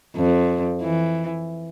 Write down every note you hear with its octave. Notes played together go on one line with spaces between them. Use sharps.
F2
E3